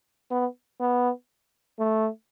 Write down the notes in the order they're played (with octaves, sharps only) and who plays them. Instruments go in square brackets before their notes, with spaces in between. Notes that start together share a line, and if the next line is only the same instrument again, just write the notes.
[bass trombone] B3
B3
A3